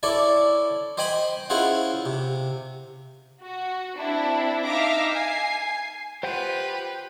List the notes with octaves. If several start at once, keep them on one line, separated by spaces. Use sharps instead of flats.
E4 A4 C#5 D5
C5 D#5 G5 G#5 B5 C6
C#4 E4 F4 G#4 C5 F#5
C3
F#4
C4 D4 E4
D#4 E5 F5 D6 A#6
G#5 C7
F4 G4 B4 C5 F#5 G5